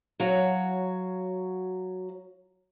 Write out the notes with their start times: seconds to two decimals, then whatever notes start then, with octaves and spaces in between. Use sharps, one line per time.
0.20 F#3 F#4 C#5 F5